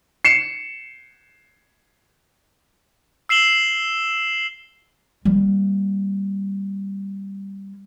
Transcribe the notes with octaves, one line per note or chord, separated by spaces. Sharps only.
C7 C#7 E7
E6 C7 E7 F#7 G7
G3 A#3